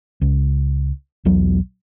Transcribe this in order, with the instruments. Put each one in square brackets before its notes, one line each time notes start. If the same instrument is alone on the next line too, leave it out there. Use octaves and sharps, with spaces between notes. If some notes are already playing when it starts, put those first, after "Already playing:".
[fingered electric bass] C#2
B1 E2 F#3